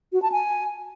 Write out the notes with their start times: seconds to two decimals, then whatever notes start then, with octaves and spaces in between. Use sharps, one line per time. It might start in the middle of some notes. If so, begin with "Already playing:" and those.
0.13 F#4
0.22 A5
0.32 G#5